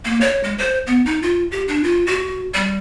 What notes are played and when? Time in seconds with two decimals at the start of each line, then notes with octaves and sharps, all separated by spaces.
0.05 A#3
0.21 C#5
0.43 G#3
0.58 C5
0.87 B3
1.06 D#4
1.22 F4
1.52 G4
1.68 D4
1.83 F4
2.07 F#4
2.54 G3